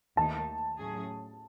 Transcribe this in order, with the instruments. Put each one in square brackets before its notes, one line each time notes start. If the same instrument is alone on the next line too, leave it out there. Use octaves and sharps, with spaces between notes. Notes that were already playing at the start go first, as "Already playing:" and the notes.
[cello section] D#2 D#3 A3 D#4 [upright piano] A5
[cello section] A2 F#3 C#4 G#4